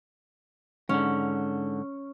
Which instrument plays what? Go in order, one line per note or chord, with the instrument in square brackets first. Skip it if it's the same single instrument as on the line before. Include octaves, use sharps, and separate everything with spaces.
[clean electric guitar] G#2 D3 [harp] C#4